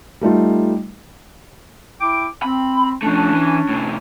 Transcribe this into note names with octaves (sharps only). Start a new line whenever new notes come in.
G3 A3 D#4 F4
E4 G5 D6
C4 B5
F3 A3 C#4 D4
E3
A2 C3